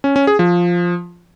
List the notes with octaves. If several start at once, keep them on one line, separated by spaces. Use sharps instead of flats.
C#4
C#4
G#4
F3